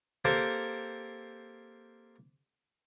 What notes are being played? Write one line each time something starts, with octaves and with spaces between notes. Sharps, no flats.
A#3 C4 G4 A4 A#4 C5